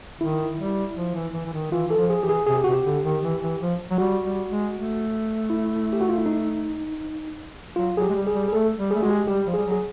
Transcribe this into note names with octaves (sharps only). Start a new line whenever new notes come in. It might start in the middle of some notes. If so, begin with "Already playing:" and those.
D#3 E4
G3
F3
E3
E3
E3
D#3
E3 F4
E3 A4
F3
G#4
E3 G4
G#4
C3 G#4
G4
C3 F#4
G4
D3
D#3
E3
E3
F3
F#3
G3 F#4
G3
G#3
A3
E4
G4
F#4
F4
E4
D#4
F#3 F4
F#3 G#4
G4
G#3
G3
G#4
G3
G#4
A3 A4
G3
A3 G#4
G#3 F#4
G4
G3 G4
F3
G3 G#4
F#3
G#4